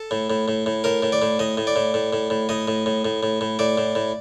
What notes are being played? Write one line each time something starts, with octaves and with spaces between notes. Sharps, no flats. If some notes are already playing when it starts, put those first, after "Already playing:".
Already playing: A4
A2
A2
A2
A2
A2 A#4
A2
D5
A2
A2 D#5
A2
D5
A2
A2
A2
A2
A2 D#5
A2
A2
A2
A2
A2
A2 D5
A2
A2